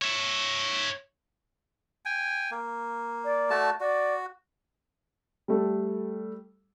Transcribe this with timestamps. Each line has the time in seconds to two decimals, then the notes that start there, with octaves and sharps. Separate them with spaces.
0.02 C#5 E5
2.05 G5 G#5
2.51 A#3
3.25 D5
3.50 A3 F#4 A5
3.80 F#4 D5
5.48 G3 A3 A4